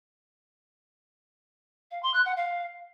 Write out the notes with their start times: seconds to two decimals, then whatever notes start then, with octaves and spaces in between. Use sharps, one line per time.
1.91 F5
2.03 C6
2.14 F#6
2.25 F#5
2.37 F5